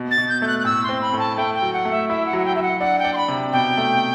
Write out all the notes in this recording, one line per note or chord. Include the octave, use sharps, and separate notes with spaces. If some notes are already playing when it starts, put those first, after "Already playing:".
Already playing: B2
A6
B2
G6
A3 G6
F#6
F#6
A2 E6
C6
C4
B5
A2
A5
A3 G5
G5
F#3
F#5
A3
E5
E4 E5
F#5
F#3
F#5
G5
F#3 E5
F#5
D4 F#5
G5
D4
C6
B5
C3
B2 G5
A3